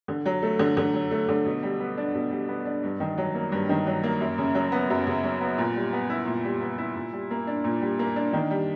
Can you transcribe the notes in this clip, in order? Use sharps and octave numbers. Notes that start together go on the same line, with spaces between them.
D3
F#3
A3
D3
D3
F#3
A3
D3
B2
G3
B3
D4
B2
G3
B3
D4
G2
D#3
F#3
A#3
G2
D#3
F#3
A#3
F#2
C#3
F#3
B3
F#2
C#3
F#3
B3
A#2
G3
B3
E4
A#2
G3
B3
E4
A#2
G3
A#3
D4
A#2
G3
A#3
D4
D#3
G3